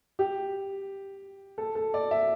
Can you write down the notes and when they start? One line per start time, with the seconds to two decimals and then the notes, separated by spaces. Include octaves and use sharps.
0.19 G4
1.58 A4
1.75 A4
1.94 D5
2.11 E5